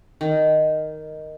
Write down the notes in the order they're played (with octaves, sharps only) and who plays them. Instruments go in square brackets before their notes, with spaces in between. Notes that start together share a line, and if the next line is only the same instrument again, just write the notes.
[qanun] D#3